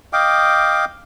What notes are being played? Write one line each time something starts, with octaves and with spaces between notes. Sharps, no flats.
D#5 F5 G5 D6